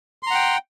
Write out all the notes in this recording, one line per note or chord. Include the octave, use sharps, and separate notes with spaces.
F#5 G5 A#5 C6